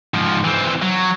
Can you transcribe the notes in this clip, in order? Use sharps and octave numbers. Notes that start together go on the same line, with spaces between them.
G#2 F3
E3 C4
F#3